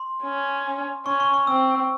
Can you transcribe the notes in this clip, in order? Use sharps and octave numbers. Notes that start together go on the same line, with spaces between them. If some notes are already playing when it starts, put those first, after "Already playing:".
Already playing: C6
C#4
C#4 C#6
C#6
C#6
C4 E6